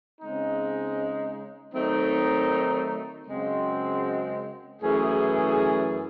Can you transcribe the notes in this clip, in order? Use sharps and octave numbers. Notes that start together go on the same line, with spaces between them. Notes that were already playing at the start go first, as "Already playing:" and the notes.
C#3 G#3 C4 D#4
D#3 F#3 A3 C4 D#4
F#2 C#3 G#3 C4 F#4
F#2 E3 A3 C#4 G#4